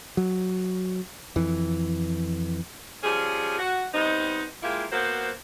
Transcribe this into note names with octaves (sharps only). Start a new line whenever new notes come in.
F#3
F2 E3
F3 G3 C#4 G#4
F#4
G3 B3 C4 D#4
G#3 A#3 E4 F4 G4
A#3 B3 F#4 C5